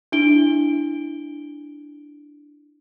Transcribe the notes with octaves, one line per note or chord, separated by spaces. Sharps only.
D4 E4 D7 G7